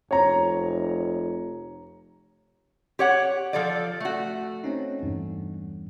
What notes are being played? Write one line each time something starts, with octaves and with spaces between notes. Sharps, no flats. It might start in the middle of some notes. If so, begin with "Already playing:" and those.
F1 C#5 A#5
G4 C#5 F#5
F3 A4 D5
A3 F#4 E5
C4 C#4 D#4
E2 G2